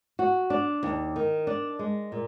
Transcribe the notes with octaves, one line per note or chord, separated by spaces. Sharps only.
F#4
D4
D#2
D#3
D4
G#3
A#2